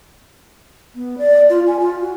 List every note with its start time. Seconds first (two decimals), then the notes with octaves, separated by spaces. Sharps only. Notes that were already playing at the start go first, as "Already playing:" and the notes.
0.95 B3
1.18 D5
1.50 F4
1.67 G#5
1.80 F4
2.01 F#4